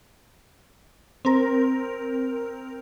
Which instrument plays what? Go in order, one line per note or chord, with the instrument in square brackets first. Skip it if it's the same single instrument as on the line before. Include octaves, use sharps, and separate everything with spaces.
[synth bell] C4 A#4